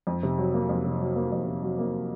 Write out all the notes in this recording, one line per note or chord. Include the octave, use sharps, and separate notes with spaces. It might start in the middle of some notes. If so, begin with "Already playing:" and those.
F2
C3
F#3
A#3
F2
C3
F#3
A#3
F2
C3
F#3
A#3